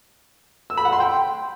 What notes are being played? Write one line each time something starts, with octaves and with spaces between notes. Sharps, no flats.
E6
B5
F#5
C6
G5